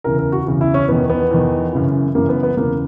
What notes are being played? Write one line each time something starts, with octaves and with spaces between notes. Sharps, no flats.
E2 C#3 E3 A#4
A#4
F#4
E2 C#3 E3
E4
C#4
E2 D#3 B3
B3
E2 D#3
F#2 C#3 E3
F#2 C#3 E3 A#3
B3
B3
E2 C#3 E3 A#3